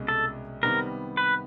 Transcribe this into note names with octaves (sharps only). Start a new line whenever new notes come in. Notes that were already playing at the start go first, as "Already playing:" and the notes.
Already playing: C2 B2 G#3 C#4
A4
C3 D#3 G3 B3 A#4
B4